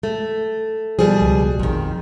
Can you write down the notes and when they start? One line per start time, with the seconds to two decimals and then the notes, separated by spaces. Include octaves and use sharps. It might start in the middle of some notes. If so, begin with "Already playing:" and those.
0.03 A3
0.99 B2 F3 G3 G#4
1.21 C#2
1.59 A#1 F2 D#3